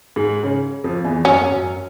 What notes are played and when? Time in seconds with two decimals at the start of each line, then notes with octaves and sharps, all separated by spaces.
0.16 G#2 G#3
0.43 C#3 C#4
0.84 F2 F3
1.05 E2 E3
1.25 F#2 F#3 C#4
1.52 F#2 F#3